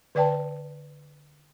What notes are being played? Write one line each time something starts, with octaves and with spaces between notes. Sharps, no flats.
D3 B4 D5 G5 A5